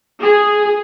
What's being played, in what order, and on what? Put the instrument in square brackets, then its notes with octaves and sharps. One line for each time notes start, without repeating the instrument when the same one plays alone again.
[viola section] G#4